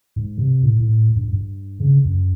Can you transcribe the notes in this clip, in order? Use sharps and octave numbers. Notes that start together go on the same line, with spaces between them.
G#2
C3
A2
A2
G2
G2
C#3
F#2